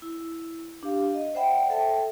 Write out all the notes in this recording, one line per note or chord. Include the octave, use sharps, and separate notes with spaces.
E4
D4 G4 F5
D#5
C5 D5 E5 F#5 G5 B5
A4 E5 G5 A5